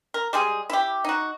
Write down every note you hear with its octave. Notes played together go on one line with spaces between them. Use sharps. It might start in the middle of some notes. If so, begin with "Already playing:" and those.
A#4
G3 G#3 G#4
E4 G4
D#4 F#4